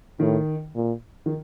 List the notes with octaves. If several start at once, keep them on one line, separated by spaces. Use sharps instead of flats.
A2 D#3
A#2
D#3